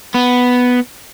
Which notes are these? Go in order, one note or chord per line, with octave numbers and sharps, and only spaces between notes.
B3